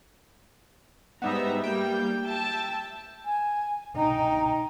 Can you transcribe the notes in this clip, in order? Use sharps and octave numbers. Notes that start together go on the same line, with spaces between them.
G#2 G3 B3 D#4 E5 A#5
G3 A#3 G5
E5 A5
G#5
D#4 G5 A#5